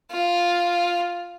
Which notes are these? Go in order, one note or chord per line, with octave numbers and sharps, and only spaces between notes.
F4